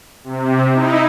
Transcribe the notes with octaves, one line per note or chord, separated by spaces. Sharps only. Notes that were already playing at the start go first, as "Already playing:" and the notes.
C3
D#4 E4